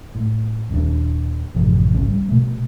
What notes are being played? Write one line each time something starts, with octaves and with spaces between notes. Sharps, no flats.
A2
D#1 D#2 D3 D4
A1 F#2 C3 F3
G#1 C#2 C#3 C#4
G3
B2 A3